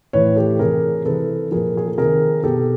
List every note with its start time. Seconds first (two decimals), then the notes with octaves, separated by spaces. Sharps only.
0.13 A2 E3 B4 C#5
0.36 G4 A4
0.59 C3 E3 G#4 A#4
1.05 C3 E3 A4 B4
1.51 A#2 F3 G#4 A#4
1.77 G#4
1.88 A4
1.98 C3 D#3 G#4 A#4
2.44 B2 G4 A4